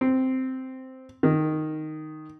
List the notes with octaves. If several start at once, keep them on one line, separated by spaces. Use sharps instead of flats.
C4
D#3